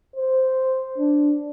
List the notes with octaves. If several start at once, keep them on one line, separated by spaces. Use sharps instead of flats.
C5
D4